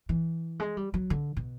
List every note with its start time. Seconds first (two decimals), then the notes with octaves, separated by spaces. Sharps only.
0.09 E3
0.60 G#3
0.77 G3
0.94 F#3
1.10 D3
1.36 B2